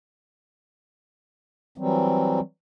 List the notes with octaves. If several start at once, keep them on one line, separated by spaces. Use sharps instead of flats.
E3 F#3 G3 C4